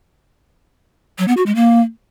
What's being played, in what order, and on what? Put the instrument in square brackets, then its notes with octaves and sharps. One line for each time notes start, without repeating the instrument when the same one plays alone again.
[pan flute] F#3
B3
F#4
G#3
A#3